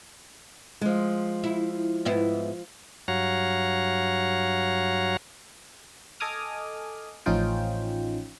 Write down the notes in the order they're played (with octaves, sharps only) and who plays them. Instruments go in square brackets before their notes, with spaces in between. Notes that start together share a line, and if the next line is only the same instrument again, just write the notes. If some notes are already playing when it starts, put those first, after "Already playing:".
[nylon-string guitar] F3 G#3
[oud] E4
G#2 B3 E4
[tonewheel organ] G2 F#3 F#4 C#5 F5 A#5
[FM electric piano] A4 D#5 G#5 D6 D#6 F6
A1 F3 C#4 D#4 F4 G5